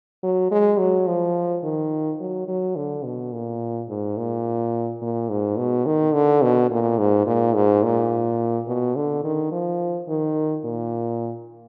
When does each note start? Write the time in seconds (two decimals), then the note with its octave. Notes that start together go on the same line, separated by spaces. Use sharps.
0.23 F#3
0.51 G#3
0.79 F#3
1.07 F3
1.63 D#3
2.20 F#3
2.48 F#3
2.76 D3
3.05 B2
3.33 A#2
3.89 G#2
4.17 A#2
5.02 A#2
5.29 G#2
5.58 B2
5.86 D#3
6.14 D3
6.42 B2
6.71 A#2
6.99 G#2
7.27 A#2
7.55 G#2
7.83 A#2
8.67 B2
8.96 D3
9.24 D#3
9.52 F3
10.08 D#3
10.64 A#2